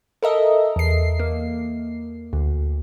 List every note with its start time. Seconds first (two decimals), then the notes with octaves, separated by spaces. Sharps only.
0.23 A4 A#4 D#5 E5
0.76 E2 C7
1.19 A#3
2.33 D2